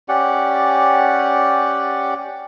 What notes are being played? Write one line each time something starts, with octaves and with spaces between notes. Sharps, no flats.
C#4 G4 D5 F#5